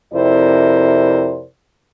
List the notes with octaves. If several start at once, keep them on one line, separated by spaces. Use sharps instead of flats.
F2 C3 E4 A#4 C5 D5